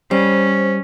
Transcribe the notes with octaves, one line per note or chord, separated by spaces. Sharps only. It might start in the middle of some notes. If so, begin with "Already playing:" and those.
G3 C#4 C5